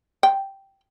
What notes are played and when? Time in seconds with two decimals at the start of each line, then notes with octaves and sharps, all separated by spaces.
0.23 G5